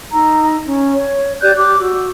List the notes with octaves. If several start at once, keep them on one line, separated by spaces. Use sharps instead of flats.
D#4 A#5 E6
C#4
C#5
G4 D5 F#6 G6
G4 D6 F#6
F#4 E6